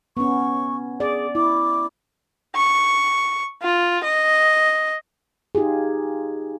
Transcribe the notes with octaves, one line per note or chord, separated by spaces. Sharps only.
B3 C#4 C#6
G#4 D5
E4 D6
C#6
F4
D#5
D#4 F4 G4 G#4